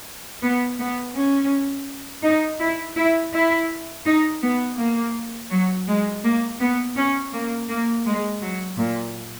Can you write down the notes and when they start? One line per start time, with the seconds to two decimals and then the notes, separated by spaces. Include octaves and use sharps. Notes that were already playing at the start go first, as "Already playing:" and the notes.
0.42 B3
0.79 B3
1.14 C#4
2.23 D#4
2.60 E4
2.97 E4
3.33 E4
4.06 D#4
4.42 B3
4.78 A#3
5.51 F#3
5.87 G#3
6.24 A#3
6.60 B3
6.96 C#4
7.33 A#3
7.69 A#3
8.06 G#3
8.42 F#3
8.78 A#2